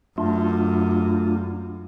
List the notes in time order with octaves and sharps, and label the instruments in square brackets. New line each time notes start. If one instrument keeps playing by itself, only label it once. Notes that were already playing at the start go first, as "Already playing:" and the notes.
[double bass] F#2 [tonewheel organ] A3 D4 F4